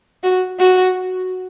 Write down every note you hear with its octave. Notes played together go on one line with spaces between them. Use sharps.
F#4
F#4